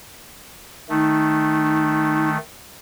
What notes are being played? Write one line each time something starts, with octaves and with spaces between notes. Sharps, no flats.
D#3 A3 D#4